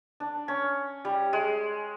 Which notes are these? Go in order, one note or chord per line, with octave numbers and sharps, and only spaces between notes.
D4
C#4
G3
G#3